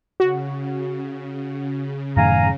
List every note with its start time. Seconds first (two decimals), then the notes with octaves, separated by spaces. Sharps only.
0.20 C#3 F#4
2.17 F#2 A2 D#3 F5 G#5 A#5